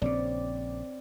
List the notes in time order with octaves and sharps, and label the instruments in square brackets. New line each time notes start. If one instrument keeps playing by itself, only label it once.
[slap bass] A#1 C#3 [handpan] C4 C#5 D5